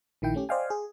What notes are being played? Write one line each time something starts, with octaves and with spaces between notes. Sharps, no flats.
A#1 D#3 E4 G5
A3 C#4 G4
C5 D5 D#5 F5 G5 G#5
G#4